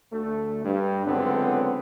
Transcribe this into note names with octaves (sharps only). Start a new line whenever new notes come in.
D2 A3
G2
C#2 F#2 D3 B3 C4